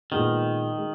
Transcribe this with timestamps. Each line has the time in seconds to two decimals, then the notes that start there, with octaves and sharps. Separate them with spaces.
0.11 A#2 D#3 G#3 B3
0.78 G#3